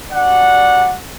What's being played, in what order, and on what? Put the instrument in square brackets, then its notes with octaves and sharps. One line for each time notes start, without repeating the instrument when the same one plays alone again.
[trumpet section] G3 D4 F#4 D5 F#5